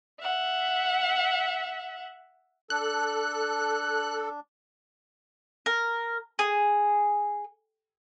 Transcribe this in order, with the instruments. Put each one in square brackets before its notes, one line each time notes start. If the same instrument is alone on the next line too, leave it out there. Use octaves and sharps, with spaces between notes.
[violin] E5 F#5
[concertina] D4 [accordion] A4 [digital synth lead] F#6
[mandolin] A#4
G#4